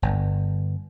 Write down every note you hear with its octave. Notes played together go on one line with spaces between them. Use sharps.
G1